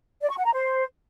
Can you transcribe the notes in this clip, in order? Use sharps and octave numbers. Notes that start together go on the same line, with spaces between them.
D5
C#6
F#5
A#5
C5